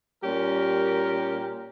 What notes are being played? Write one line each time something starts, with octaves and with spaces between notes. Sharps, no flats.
A#2 G3 C#4 G4 A#4